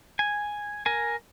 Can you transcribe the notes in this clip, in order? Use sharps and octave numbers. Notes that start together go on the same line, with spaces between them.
G#5
A#4 G#5